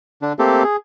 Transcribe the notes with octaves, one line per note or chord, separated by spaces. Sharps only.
D3 D4
A3 A#3 C4 G4 A4
G#4